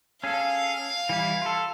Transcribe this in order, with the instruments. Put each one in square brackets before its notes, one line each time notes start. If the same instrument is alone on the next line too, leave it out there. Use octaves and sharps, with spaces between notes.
[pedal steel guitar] C#4 G#4 A4 [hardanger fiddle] F5
[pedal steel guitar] E3 G3 E4
F4 A4